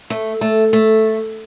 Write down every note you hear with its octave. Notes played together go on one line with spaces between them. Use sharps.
A3
A3
A3